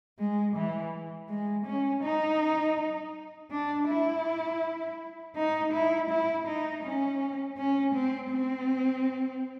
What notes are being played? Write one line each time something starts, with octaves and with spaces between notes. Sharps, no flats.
G#3
E3
G#3
C#4
D#4
D4
E4
D#4
E4
E4
D#4
C#4
C#4
C4
C4